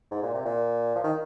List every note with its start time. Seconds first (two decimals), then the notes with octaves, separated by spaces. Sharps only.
0.11 G#2
0.23 A#2
0.34 C3
0.45 A#2
0.96 F3
1.04 D#3